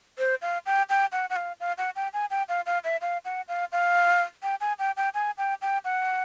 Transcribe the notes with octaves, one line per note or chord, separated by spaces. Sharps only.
C5
F5
G5
G5
F#5
F#5
F5
F5
F#5
G5
G#5
G5
F5
F5
E5
F5
F#5
F5
F5
G5
G#5
G5
G5
G#5
G5
G5
F#5